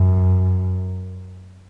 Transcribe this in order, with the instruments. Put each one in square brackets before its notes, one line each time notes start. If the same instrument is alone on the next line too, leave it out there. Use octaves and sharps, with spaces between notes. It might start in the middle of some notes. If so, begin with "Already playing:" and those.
Already playing: [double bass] F#2